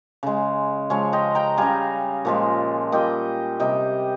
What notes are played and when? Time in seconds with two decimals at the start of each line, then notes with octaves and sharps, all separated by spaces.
0.23 C#3 G#3
0.90 C#3 F3 G#3 C#5 F5
1.13 D#5 G5
1.35 G5 A#5
1.57 C#3 G3 F5 G#5
2.25 A#2 F3 G#3
2.92 A#2 G3 D#5 G5
3.60 C3 G3 D#5 G5